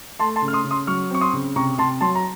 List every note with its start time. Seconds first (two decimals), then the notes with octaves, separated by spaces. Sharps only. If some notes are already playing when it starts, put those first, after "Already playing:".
0.19 A3 A5 C6
0.36 A5 C6
0.42 C#3
0.48 F6
0.53 C6 D#6
0.65 C#3
0.71 C6 D#6
0.87 F#3 C#6 F6
1.11 C4 C#6
1.21 C6 D#6
1.33 C#3
1.56 C3 A#5 C#6
1.78 C3 A5 C6
2.01 F#3 A5 C6
2.16 A#5